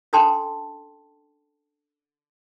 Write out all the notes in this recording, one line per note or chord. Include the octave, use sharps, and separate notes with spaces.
C#4 D4 A4 G5 A5 C6